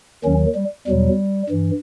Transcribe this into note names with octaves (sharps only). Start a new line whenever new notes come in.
D#2 D#3 F#3 C#4
G3
E2 B2 F#3 G3
G2 E3